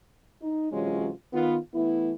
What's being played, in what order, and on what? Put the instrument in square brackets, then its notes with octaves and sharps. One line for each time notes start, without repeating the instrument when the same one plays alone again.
[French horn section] D#4
C3 E3 F#3 G#3 C#4 F4
D#3 B3 F4
E3 A3 B3 E4